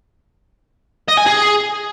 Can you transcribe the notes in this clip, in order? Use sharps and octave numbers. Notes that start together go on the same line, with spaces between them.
D#5
G#5
G#4